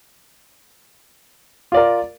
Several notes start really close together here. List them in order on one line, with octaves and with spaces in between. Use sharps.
F4 D5 A#4